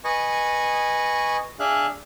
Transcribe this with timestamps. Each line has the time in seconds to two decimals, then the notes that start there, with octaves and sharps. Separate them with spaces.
0.04 B4 D#5 G#5 C#6
1.60 D4 G#4 E5 F5 F#6